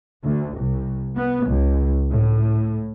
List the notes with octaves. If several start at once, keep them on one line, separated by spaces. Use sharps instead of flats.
D2
C2
B3
C#2
A2